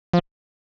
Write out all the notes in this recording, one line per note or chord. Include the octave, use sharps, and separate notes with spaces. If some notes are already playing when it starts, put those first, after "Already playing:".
F3